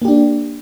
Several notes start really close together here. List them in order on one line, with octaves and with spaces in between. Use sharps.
A#3 G4 D4